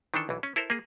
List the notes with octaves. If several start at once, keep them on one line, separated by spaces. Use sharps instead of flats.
D#3 E3 D4 A4
B1 E3
C#4
E4 A4 A#4 C5
A#3 G#4